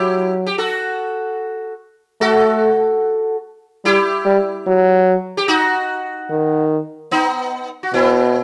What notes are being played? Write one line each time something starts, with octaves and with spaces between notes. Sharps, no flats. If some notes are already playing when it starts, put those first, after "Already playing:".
Already playing: F#3 E4 G4
G4
F#4 A4
A3 F#4 A4
G3 E4 G4
G3
F#3
G4
D#4 F#4
D#3
B3 D#4
F#4
B2 C4 E4